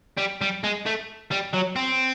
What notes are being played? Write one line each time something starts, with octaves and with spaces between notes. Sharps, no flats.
G3
G3
G#3
A3
G3
F#3
C4